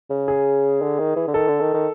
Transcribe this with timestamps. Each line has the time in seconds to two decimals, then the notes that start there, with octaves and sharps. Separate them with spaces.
0.10 C#3
0.28 G#4
0.82 D3
1.00 D#3
1.16 E3
1.28 D3
1.34 D#3 A4
1.48 D3
1.61 D#3
1.74 D#3